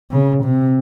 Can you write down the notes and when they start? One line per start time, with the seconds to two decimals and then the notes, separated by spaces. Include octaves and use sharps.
0.11 C#3
0.43 C3